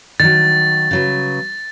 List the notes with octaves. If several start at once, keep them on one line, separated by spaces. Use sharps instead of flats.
D#3 F#3 A6
C#3 F#3 B4